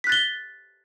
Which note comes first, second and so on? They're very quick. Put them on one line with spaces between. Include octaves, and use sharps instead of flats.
B6 F#6 A6 G7